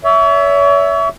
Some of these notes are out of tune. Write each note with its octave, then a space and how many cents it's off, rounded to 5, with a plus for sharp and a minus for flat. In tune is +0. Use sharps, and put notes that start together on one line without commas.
C#5 +35 E5 +0